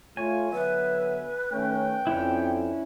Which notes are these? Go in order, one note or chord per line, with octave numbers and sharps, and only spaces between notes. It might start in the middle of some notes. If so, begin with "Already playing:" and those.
A3 F4 C#5 G#5
D3 F#3 B3 B4 E5
D#3 A3 C#4 G5
F2 C#4 D4 E4